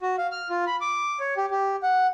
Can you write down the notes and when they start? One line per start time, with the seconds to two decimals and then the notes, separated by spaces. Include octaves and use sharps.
0.01 F#4
0.18 F5
0.32 F6
0.50 F4
0.67 B5
0.81 D6
1.20 C#5
1.37 G4
1.51 G4
1.83 F#5